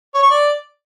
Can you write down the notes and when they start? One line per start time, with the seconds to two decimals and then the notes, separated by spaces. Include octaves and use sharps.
0.14 C#5
0.22 C#6
0.30 D5